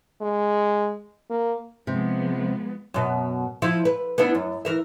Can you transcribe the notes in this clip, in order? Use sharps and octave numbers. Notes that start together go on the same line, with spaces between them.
G#3
A#3
C3 F3 G#3 B3
F#2 B2
F3 E4
B4
B3 D4 E4
F#2
E3 A#4 E5